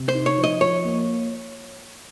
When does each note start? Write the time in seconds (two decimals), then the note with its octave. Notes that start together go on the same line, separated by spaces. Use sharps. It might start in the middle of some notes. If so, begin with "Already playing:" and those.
Already playing: C3
0.09 C5
0.15 D#4
0.26 C#5
0.38 F3
0.44 D#5
0.61 F3 C#5
0.85 A#3